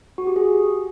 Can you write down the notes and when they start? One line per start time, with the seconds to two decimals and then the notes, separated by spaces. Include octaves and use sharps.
0.18 F#4
0.27 G4
0.36 G#4